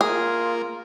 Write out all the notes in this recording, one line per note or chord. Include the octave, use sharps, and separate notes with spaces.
A#3 F4 G#4